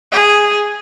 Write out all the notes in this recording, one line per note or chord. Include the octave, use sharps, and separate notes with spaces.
G#4